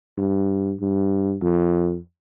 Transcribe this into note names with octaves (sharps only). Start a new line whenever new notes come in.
G2
G2
F2